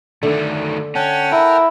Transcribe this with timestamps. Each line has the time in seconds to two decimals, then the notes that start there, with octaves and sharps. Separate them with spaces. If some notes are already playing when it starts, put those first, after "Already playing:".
0.23 D3 D#3 A3
0.95 C#4 F#5 G5 A5
1.33 E4 A#4